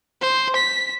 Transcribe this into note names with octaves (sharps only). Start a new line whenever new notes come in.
C5
B6